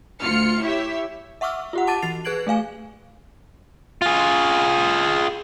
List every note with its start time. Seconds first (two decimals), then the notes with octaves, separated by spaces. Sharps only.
0.21 D2 F4 F6 C#7
0.62 E4 G4 C#5 E5
1.41 E5 F#5 C#6 D6 E6 F6
1.73 F4 G4 F#5
1.87 F#5 A5 D6 A6 D#7
2.02 E3 F#4 A6 C7 F7
2.25 G#4 B4 F#6 G#6 D7 F#7
2.47 A3 G#4 F5 G#5
4.02 F4 G#4